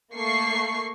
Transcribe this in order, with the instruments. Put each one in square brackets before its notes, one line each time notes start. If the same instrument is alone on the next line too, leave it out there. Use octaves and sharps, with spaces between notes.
[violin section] A3 A#3 C#6 C7